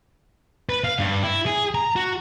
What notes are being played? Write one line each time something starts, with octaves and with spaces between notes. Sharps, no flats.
B4
F5
G2
E4
G#4
A#5
F#4